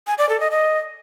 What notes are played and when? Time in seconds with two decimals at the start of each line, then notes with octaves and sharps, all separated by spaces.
0.07 G#5
0.18 D5
0.29 A4
0.40 D#5
0.51 D#5